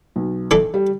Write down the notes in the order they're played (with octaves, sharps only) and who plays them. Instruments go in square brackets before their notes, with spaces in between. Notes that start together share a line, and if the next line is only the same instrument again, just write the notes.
[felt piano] B1
[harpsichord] E3 D4 A4
[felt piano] G3